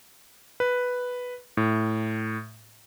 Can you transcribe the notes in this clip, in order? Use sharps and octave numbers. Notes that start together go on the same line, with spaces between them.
B4
A2